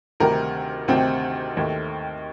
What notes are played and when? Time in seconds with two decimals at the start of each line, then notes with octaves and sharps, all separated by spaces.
0.20 D2 C3 D#3 G3 A#4
0.88 D2 C3 D#3 C4
1.57 D#2 D#3 A3